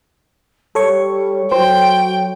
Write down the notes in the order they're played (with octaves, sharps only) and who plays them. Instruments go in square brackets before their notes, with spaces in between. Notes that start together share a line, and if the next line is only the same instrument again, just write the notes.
[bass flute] G3 [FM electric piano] A4 C#5 C#6
[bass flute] F#3 [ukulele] C5 [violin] G5